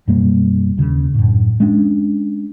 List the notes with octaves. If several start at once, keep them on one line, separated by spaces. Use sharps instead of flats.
F#2 B2 G3 A#3
D#2 C#3
F#2 A2
G#3 C#4 D4